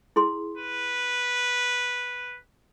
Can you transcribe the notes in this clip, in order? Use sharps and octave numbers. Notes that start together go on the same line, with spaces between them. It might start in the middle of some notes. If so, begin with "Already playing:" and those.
E4 G#4 C6
B4